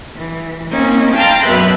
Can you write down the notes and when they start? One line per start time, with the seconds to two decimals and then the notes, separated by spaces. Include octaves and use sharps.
0.15 E3
0.70 A#3 C4 C#4 D#4
1.14 F5 G5 A5 A#5 C6 F6
1.44 F#2 B2 B4 E5 F#6